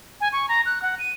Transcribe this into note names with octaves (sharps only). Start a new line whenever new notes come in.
G#5
C#6
A#5
F#6
F#5
D#7